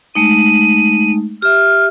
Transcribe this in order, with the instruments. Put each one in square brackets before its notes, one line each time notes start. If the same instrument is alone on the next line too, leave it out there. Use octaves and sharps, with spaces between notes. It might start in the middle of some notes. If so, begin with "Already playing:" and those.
[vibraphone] G#3 A3 D#4 [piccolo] D#7
[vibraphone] G4 E5 [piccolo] F6